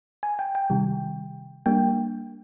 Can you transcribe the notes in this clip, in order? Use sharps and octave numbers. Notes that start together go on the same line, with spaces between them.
G#5
G5
G5
C3 D#3 G3
G3 A#3 D4 G5